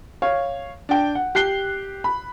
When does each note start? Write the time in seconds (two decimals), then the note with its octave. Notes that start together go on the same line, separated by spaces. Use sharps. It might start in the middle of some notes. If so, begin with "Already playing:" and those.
0.22 C#5 F5
0.89 D4 G5
1.15 F#5
1.35 G4 F#6 C7 G7
2.04 B5